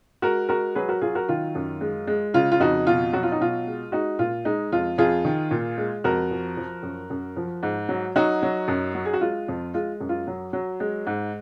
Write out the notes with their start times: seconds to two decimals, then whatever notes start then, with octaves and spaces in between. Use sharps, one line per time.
0.22 G#3 F#4 A#4
0.49 G#3 F#4 A#4
0.75 F#3 G#4 B4
0.89 F#4 A#4
1.01 F#3 F4 G#4
1.15 F#4 A#4
1.29 D#3 F4
1.55 F#2
1.81 G#3
2.08 G#3
2.34 C#3 F4
2.52 F4
2.60 F2 D#4 F#4
2.87 B2 F4
3.13 F#3 F#4
3.23 F4
3.32 D#4
3.40 B2 F4
3.67 G#3
3.92 G#3 D#4 F#4
4.19 A#2 F4
4.45 G#3 D#4
4.72 F2 F4
4.98 F2 F4 G#4
5.25 D#3
5.51 A#2
5.78 G#3
6.04 F2 F#4 A#4
6.31 F3
6.57 F3
6.83 F#2
7.10 F#2
7.37 F3
7.63 G#2
7.89 F#3
8.15 F#3 D#4 F#4
8.43 F#3
8.68 F#2
8.95 F#3
9.05 G#4
9.13 F#4
9.21 G#3 F4
9.48 F2
9.74 G#3 F4
10.01 F#2
10.09 F4
10.27 F#3
10.53 F#3
10.80 G#3
11.07 G#2